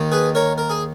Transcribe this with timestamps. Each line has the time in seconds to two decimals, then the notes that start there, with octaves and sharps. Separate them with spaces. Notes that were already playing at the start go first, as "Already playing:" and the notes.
Already playing: D#2 D#3
0.12 G#4 B4
0.35 A#4 C#5
0.58 A#4
0.70 G#4